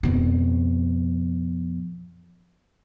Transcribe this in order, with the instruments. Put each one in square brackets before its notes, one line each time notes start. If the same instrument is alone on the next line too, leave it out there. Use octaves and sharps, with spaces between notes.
[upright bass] F2 B2